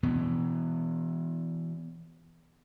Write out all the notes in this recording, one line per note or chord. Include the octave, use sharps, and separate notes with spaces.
B2 E3 B3